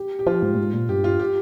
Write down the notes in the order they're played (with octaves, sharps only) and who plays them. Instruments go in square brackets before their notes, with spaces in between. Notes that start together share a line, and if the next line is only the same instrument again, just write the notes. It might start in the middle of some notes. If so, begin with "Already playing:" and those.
Already playing: [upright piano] G4
G4
[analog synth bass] F3 [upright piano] F4
[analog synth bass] G#2
A#2
G#2
A#2
[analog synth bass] G2 [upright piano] G4
[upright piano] F4
G4